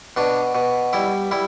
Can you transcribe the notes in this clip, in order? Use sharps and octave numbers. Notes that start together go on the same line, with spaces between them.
B2 D4
B2
G3 E4
G3 E4